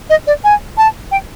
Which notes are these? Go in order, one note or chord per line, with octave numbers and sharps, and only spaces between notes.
D#5
D5
G#5
A5
G5